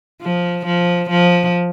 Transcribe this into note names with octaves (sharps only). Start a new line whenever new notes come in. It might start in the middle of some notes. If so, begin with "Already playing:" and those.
F3
F3
F3